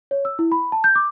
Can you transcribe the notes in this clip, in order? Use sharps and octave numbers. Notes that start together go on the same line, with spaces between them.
C#5
E6
E4
B5
A5
G6
D6